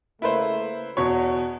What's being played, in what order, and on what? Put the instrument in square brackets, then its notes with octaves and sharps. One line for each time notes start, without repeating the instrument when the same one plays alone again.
[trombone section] C#3 A3 A#3 [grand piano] E4 B4 C5
[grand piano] E2 B2 C#5 [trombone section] F#4